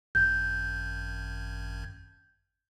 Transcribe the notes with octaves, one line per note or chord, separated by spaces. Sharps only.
G#1 F#2 G6 G#6